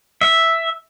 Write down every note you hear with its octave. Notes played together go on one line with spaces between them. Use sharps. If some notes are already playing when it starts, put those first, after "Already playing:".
E5